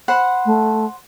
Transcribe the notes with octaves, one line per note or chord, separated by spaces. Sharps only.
C5 F#5 B5
A3